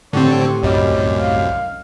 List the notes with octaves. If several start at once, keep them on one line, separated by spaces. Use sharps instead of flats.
A2 D3 C4 G4 A4 C#5
C2 F#2 G3 C#5 D#5 D6
F5